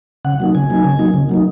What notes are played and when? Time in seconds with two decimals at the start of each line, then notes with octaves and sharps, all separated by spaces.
0.25 C#3 F#5
0.40 F#3 A#3 D#4
0.55 C#3 G#5
0.70 F#3 A#3 D#4
0.84 C#3
0.99 F#3 A#3 D#4
1.14 C#3
1.29 F#3 A#3 D#4